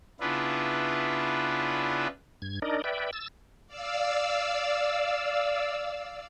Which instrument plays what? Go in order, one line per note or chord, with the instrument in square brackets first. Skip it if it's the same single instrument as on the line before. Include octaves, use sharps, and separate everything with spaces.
[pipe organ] C#3 B3 D4 E4 F4 B4
[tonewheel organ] G2 G#6
D4 D#4 A#4 D5 D#5
B4 D5 E5 G5
E6 A6
[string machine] D5 F5 E6